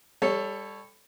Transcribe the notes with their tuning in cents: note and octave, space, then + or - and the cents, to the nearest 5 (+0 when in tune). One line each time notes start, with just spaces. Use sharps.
G3 +30 A4 +0 C#5 +0